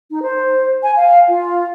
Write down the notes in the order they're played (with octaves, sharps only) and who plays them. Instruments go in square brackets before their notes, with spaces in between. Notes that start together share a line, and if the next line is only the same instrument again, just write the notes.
[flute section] D#4
C5
G#5
F5
F4